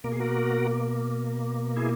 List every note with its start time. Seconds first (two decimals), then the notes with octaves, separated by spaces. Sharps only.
0.04 B2 A#3 A#4
0.12 G#4
0.20 F#4 A#4
1.76 E4 G#4